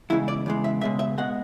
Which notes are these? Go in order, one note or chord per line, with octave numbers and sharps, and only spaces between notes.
E2 C#3 G#3 E4
D5
E2 C#3 G#3
E5
C#2 B2 G#3 E5
E5
B2 G#3 F#5